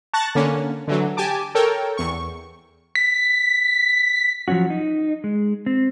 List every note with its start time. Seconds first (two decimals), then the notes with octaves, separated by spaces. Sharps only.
0.14 A5 C#6 F#6 A6 A#6
0.35 D3 A#3 C#4
0.87 D3 E3 F#3
1.17 G4 G#5 A5 D6
1.55 A4 A#4 C#5 G5
1.97 E2 C#6
2.95 B6
4.48 F3 F#3 A3 C#4 F#4
4.70 D#4
5.24 G#3
5.66 C4